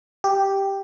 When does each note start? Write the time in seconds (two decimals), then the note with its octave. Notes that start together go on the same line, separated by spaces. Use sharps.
0.24 G4